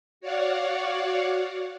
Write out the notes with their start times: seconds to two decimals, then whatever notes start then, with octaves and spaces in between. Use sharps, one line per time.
0.20 F#4 C#5 D5 F5 F#5